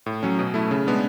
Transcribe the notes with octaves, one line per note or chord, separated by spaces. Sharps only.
A2
F#3 C#4
B2
A3 E4
C#3
G#3 B3 D4